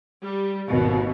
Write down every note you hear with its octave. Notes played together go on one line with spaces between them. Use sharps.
G3
G#1 D#2 B2